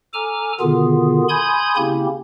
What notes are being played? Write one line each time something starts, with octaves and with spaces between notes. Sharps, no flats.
A4 G#5 A#5 D6 F6
B2 D3 D#3 B3 F4 G#4
G#5 B5 C6 D#6 G6 G#6
C#3 A#3 C4 C#4 E4 G4